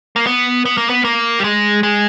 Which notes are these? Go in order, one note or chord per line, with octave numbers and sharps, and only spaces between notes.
A#3
B3
B3
A#3
B3
A#3
G3
G#3
G#3